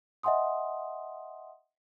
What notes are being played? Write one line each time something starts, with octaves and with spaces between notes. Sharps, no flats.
D#5 E5 F#5 G#5 C6 D#6